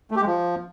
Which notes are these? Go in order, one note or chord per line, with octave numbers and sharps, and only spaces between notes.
A3
G4
G#3
F3